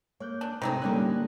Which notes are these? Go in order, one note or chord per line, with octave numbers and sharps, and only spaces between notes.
A#3 C#5 F#6 G6
D4
C3 D#3 A3 C4 D#4 C5
D3 G3 A#3 C#4 F#6